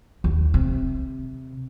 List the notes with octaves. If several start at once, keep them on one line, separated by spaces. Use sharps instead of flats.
D#2
C3